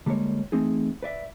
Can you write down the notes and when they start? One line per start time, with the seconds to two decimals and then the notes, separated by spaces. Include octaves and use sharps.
0.06 D3 G3 G#3 A#3 C#5
0.52 E3 A3 C4 D#4 G#4
1.03 B4 D5 E5